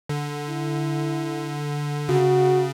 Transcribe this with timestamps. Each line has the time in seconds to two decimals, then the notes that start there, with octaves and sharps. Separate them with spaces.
0.09 D3
0.49 E4
2.09 C#3 F#4